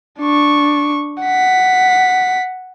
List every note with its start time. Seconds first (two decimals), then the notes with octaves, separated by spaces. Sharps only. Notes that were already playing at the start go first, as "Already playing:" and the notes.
0.19 D4 C#6
1.22 F#5 B6